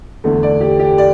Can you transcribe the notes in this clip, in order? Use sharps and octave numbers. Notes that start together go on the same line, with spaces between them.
E2 D3 A3
D5
G4
G4
D5